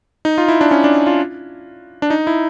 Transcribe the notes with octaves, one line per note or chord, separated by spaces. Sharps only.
D#4
F4
E4
D4
C#4
D4
F4
D4
D#4
E4